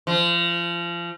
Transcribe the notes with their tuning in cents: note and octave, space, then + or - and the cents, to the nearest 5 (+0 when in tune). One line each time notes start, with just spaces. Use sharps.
F3 -30